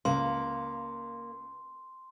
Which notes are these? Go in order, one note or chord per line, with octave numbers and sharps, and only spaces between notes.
C#2 A#3 C6